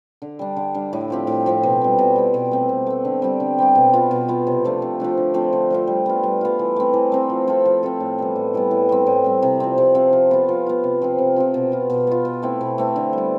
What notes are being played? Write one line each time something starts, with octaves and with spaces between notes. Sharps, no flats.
D3
G3 D4
D3
G3 D4
A2
F3 C4 G4
A2
F3 C4 G4
B2
G3 C4
B2
G3 C4
B2
A3 C4
B2
A3 C4
D3
G3 C4 G4
D3
G3 C4 G4
B2
B3 F4
B2
B3 F4
C3
F3 A3 D4
C3
F3 A3 D4
D3
F3 A3 C4
D3
F3 A3 C4
G3
B3 F4
G3
B3 F4
E3
A3 C4
E3
A3 C4
F3
C4 F4 A4
F3
C4 F4 A4
A2
E3 G3 B3
A2
E3 G3 B3
A2
G3 C4
A2
G3 C4
C3
F3 C4
C3
F3 C4
F3
B3 F4
F3
B3 F4
C3
F3 C4 F4
C3
F3 C4 F4
B2
B3 F4
B2
B3 F4
B2
A3 C4 E4
B2
A3 C4 E4
D3
G3 B3